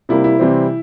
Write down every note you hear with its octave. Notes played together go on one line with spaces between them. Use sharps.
C3 G3 A#3 E4
E4
C3 E3 G3 C4